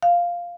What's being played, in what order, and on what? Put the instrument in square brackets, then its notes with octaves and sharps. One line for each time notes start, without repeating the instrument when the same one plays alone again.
[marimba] F5